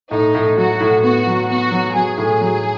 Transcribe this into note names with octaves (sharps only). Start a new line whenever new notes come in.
A2 D#4
A2
F#3 F#4
A2
B3 F#4
F#3
B3 F#4
F#3
F#3 G#4
A2
F#3